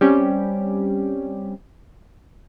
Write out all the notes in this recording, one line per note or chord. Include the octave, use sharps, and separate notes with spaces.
G3 C4 C#4 G4